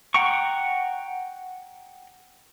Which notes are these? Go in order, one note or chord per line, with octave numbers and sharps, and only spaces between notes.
F#5 G5 A#5 C#6